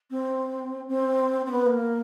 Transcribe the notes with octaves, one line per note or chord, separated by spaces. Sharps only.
C4
C4
C4
B3
A#3